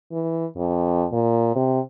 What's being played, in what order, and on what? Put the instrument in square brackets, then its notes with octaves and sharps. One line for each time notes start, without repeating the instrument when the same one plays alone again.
[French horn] E3
F2
A#2
C3